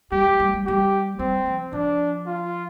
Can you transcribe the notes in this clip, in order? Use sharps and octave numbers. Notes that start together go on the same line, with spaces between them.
G3 G4
G3
G3
G3
G3 G4
G3 C4
F3
F3 D4
F4